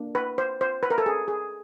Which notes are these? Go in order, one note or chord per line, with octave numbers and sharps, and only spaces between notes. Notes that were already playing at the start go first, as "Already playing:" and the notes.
Already playing: A#3 D4
B4
C5
C5
B4
A#4
A4
G#4
G#4